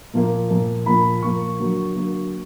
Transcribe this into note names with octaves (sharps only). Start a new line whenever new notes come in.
A#2 F3 A#3
A#2 F3 A#3
A#2 F3 A#3 B5
A#2 F3 A#3 C#6
D3 F#3 A#3
D3 F#3 A#3